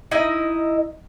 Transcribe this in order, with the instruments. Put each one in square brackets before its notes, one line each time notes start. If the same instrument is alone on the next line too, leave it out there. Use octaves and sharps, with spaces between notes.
[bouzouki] D#4 E4 D#5